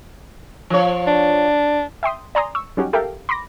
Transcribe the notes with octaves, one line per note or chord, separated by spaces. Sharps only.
F3 C#5
D4
E5 G5 C6 D#6
D5 G#5 A#5 C6 D#6
C#6 E6
F#3 G3 C#4 D#4 F#4 G4
G4 A4 A#4 E5 F5 G5
B5 C6 D6 A#6